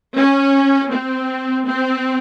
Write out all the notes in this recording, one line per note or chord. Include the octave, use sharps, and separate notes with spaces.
C#4
C4
C4